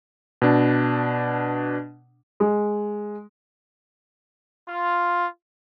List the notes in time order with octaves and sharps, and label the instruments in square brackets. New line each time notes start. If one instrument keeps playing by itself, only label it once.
[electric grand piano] B2 D4
[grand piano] G#3
[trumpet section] F4